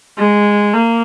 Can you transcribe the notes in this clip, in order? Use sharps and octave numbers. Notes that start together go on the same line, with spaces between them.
G#3
A#3